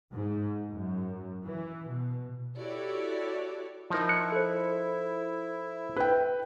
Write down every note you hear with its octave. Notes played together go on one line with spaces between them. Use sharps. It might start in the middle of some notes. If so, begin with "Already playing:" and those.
G#2
F#2
E3
B2
E4 F#4 G4 A4 C#5 D5
F3 D#4 E4 A#4
F#6 C#7
A4 C5
B4 G5